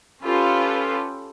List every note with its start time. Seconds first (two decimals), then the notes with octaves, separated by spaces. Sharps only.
0.23 C#4 F4 G4 A4 B4